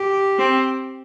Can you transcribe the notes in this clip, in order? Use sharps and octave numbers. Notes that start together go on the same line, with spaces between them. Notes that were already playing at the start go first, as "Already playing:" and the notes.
Already playing: G4
C4